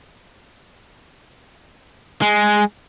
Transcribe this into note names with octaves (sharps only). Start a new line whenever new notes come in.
G#3